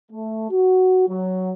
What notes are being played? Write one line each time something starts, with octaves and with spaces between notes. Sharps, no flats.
A3
F#4
F#3